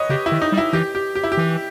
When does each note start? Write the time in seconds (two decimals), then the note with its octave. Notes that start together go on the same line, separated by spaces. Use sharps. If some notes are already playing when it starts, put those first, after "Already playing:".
Already playing: B4 C#5 D#5
0.09 C#3 G4
0.26 E4
0.32 D#3
0.42 D#4
0.52 G3
0.58 E4
0.73 E3 G4
0.95 G4
1.16 G4
1.24 E4
1.32 G4
1.37 E3